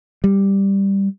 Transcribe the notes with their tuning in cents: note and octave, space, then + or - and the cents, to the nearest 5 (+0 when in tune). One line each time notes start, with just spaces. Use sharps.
G3 +5